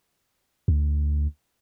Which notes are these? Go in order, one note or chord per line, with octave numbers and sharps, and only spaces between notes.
D2